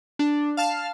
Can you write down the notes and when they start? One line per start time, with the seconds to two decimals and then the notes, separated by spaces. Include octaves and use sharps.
0.19 D4
0.57 F5 A5 F6